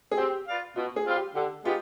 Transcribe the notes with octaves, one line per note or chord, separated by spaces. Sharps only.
G#4
C4 G4
F4 B4 D5 F5
B2 F4
G#4
G3 C4 F4
G4
D3 G4
G#3 B3 D#4 F4 G4